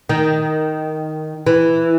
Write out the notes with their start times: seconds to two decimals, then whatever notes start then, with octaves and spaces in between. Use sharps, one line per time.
0.09 D#3
1.47 E3